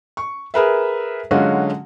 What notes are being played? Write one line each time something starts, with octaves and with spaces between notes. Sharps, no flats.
C#6
G#4 A#4 B4 E5
D3 F#3 G#3 C#4 F4 F#4